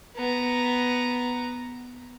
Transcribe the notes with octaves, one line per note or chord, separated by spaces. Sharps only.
B3 A#5